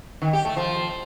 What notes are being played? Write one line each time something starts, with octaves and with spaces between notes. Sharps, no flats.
D#3
G4
A3
F3